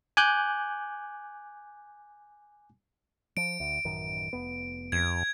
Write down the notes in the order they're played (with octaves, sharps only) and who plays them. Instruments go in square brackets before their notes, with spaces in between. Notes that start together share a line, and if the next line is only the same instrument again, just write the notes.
[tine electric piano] G#5 D6 F#6 G6
[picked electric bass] F3 [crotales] D7
[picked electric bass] D2
A1 F#2 D#3
F1 B3
[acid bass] F2 [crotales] G#6